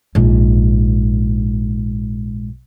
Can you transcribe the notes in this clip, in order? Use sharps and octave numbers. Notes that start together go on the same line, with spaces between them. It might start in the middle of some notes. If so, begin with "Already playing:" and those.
A#1 G#2